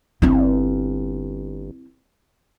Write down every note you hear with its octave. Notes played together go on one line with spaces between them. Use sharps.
G1 C4 E4